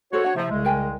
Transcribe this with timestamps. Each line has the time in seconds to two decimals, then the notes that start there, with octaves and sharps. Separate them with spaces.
0.13 F#4 A4 C5 C#5
0.24 D4 F#5
0.36 C3 F3 E4 E5
0.51 C2 C#3 G#3
0.65 A#4 G5 G#5